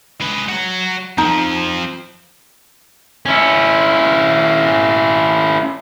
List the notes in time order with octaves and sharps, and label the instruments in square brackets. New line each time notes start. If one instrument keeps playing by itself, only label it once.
[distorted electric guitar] G#3 B4
F#4 C#5
[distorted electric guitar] F2 F3 [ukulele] D#4
[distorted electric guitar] C#4 E4